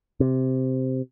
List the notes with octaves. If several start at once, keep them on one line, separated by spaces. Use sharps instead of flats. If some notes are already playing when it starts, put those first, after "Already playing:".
C3